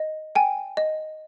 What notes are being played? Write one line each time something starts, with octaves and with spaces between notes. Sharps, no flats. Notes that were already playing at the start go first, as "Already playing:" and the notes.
Already playing: D#5
G5 G#5
D#5